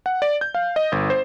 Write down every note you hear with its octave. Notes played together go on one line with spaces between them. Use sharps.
F#5
D5
G6
F5
D#5
G1
C5